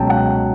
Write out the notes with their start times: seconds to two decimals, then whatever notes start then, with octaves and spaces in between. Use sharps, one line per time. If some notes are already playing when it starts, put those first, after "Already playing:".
Already playing: C#2 B2 F#3 G5 A5
0.10 F#5